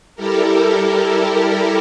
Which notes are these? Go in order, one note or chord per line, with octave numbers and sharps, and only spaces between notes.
G3 E4 G4 A4 A#4